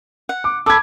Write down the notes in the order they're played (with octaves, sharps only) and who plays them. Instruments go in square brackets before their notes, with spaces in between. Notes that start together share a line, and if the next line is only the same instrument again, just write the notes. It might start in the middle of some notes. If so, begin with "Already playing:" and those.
[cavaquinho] F#5
[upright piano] D6
[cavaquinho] A4 B5 [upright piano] D6 G#6